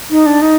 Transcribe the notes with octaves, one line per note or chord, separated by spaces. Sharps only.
D#4
D4
D#4